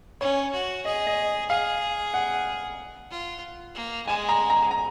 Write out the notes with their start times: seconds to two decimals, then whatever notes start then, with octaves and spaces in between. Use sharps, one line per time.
0.21 C#4 C#5
0.53 F#4
0.85 G#4 D#5
1.07 D#5
1.50 G#4 F5
2.14 F#5
3.11 F4
3.75 A#3
4.06 G#3 G#5
4.29 A#5
4.50 A#5
4.71 A#5